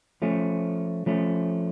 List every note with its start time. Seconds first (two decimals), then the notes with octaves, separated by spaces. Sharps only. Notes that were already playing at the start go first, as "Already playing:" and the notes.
0.22 F3 A3 C#4
1.06 F3 A3 C#4